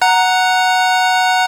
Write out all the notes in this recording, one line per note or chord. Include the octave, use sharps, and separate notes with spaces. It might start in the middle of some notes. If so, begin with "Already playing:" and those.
F#5 A#5 F#6